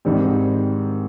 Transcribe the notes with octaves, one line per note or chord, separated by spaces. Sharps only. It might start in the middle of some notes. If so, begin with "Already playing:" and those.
G#2 D#3 G3 C4